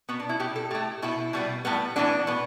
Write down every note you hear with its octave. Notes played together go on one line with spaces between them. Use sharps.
B2 B3
D4
E4
B2 B3 G4
A4
A2 A3 G4
B2 B3 E4
B2 G3 B3
A2 G3 B3
A2 E3 B3 D4
B2 B3